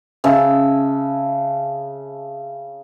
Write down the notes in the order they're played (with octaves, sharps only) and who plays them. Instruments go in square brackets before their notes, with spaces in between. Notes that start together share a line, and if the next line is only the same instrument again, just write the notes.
[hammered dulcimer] C#3 E5 A5